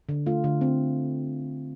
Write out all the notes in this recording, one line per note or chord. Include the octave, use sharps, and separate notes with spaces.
D3
A3 F4
D3
C4